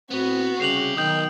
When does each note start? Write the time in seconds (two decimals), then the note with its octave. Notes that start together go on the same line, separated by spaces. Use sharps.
0.11 A2 B3 C4 F#4
0.60 C2 C#3 G4 C7 F7 F#7
0.97 B1 D#3 G5 D#6 G6 F#7